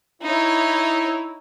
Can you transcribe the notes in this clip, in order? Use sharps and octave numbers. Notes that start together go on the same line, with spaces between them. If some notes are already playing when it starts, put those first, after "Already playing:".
D#4 E4 C#5